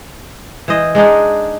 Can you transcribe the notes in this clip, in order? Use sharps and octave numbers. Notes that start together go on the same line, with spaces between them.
E3 C5 D#5
G#3 D4 D#4 G#4